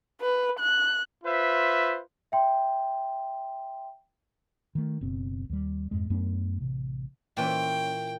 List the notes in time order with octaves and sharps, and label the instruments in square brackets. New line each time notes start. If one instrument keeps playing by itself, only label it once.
[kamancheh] B4
F#6
[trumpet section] F4 B4 C5 E5
[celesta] E5 G5 C6
[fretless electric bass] D#3 A3
F#1 B2 C4
D#2 G3
F2 G#2 G#3
F#2 A3 B3 D4
A1 C3
[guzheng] A#2 E3 C#4 [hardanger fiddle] G5